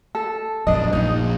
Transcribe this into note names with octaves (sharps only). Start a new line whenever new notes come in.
A4
A#1 F#2 D4 D#5
A#1 D#4